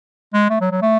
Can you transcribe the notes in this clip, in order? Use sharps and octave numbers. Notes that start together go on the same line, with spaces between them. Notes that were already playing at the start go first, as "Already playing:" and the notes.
G#3
A3
F#3
F#3
A3